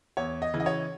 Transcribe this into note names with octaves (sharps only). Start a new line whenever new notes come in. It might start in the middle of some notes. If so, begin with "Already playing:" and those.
E2 C#5
D#5
C#3 E3
D#5
C#5